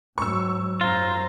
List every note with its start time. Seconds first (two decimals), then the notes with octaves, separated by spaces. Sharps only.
0.18 G#2 F#3 C#6 E6
0.81 F#2 F4 C5 A#5